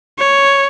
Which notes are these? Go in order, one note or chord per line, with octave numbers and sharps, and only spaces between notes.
C#5